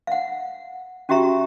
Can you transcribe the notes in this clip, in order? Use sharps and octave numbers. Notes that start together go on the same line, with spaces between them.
F5 F#5
C#4 F#4 G4 E5 A#5 C#6